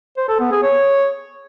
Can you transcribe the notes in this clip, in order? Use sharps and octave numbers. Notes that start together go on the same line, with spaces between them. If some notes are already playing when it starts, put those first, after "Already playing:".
C5
A4
B3
G#4
C#5